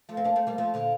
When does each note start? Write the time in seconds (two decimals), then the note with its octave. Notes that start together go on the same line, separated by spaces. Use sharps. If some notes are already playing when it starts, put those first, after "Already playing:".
0.09 F3 A3
0.17 C4
0.24 A#3 D4
0.36 A3 C4
0.47 G3 A#3
0.58 F3 A3
0.74 A#2 D3